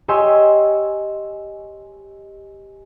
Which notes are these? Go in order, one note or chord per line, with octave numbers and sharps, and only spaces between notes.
G4 C#5 D#5 G#5 C6 E6